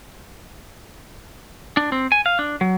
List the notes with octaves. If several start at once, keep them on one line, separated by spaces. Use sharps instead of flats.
D4
C4
G#5
F5
D4
F#3